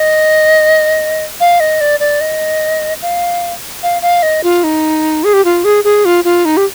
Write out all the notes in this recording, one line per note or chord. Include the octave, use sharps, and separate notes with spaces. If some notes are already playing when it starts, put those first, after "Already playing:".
Already playing: D#5
F5
D#5
D5
D5
D#5
F5
F5
F5
D#5
F4
D#4
G#4
G4
F4
G#4
G#4
F4
F4
D#4
G4